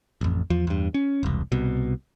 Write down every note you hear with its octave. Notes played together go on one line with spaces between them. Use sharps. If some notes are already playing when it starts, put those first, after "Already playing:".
A1 F2
E2 F3
E2 G2
C#4
E1 C2
C2 B2